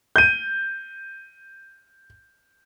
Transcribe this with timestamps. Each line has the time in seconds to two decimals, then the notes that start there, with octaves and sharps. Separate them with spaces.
0.16 G6 D#7